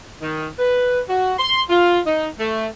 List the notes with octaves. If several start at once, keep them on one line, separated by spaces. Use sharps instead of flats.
D#3
B4
F#4
C6
F4
D#4
A3